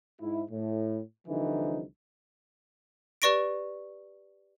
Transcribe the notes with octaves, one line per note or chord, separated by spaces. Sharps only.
G#2 E4
A2
C2 D3 E3 F3 D#4
G4 B4 D5 C#6 A#6 D7